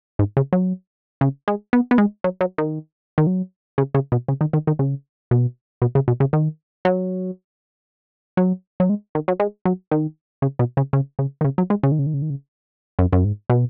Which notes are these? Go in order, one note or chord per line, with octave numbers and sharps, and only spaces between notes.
G#2
C#3
F#3
C#3
G#3
B3
B3
G#3
F#3
F#3
D#3
D#3
F#3
C#3
C#3
B2
C#3
D#3
D#3
D#3
C#3
B2
B2
C#3
B2
C#3
D#3
F#3
F#3
F#3
G#3
D#3
F#3
G#3
F#3
D#3
C#3
B2
C#3
C#3
C#3
D#3
C#3
F#3
G#3
C#3
D#3
C#3
D#3
C#3
D#3
C#3
F#2
F#2
G#2
B2